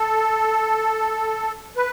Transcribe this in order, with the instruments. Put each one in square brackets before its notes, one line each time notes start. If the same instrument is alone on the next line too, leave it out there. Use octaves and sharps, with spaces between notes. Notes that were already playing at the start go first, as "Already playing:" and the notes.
Already playing: [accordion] A4
B4